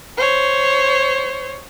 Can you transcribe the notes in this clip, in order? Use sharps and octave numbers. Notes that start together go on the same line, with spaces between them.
C5 C#5